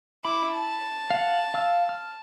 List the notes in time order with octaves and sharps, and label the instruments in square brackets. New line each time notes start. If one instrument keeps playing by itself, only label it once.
[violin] E4 D6 [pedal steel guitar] B5
[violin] A5
[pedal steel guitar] F5 F#5
F5 E6 F6
F6